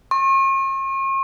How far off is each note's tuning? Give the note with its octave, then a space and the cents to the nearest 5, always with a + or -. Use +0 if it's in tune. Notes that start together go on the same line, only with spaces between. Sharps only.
C#6 -45